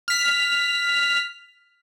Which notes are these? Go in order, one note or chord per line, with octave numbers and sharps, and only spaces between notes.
F6 B6